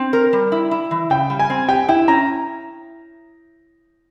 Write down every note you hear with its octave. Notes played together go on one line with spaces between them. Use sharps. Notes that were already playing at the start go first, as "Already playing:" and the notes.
Already playing: C4
A#4
G3
E4
E4
E3
C#3 G5
G3
G#5
C4
G4 G5
E4 G5
C#4 A#5